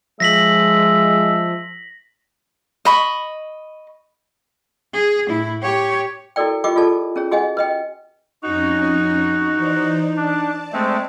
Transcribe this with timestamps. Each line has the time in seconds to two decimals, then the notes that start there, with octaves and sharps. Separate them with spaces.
0.20 F3 G#3 E5 A#6 B6 F#7
2.85 D#5 B5 C#6
4.94 G#4
5.28 A2 E4
5.62 G4 C#5
6.36 E4 F#4 A4 A#4 D5 G5
6.64 F4 G4 A#4 D#5 G5 D6
6.76 F4 G#4 A4 D5 A5
7.16 C#4 G#4 C#5
7.31 F#4 G#4 D#5 F#5 G#5
7.57 B4 D#5 G5
8.43 F2 C#4 D#4 F#4 G#5
9.53 E3 C5 D5
10.17 D4 D5 A5
10.73 G#3 A3 C4